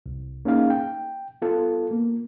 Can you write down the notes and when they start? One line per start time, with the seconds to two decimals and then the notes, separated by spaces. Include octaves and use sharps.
0.06 C2
0.45 A#3 C#4 D#4 G#4 F5
0.70 G5
1.42 B3 F4 A4
1.91 A#3